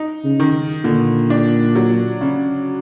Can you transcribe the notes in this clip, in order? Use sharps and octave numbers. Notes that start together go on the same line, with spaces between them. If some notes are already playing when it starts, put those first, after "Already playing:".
Already playing: D#4
C#3
D#3
A#2 D3
D4
F#3
C#3